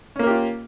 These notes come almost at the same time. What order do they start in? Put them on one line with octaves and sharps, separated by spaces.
C#4 A#3 A#4 G4 F4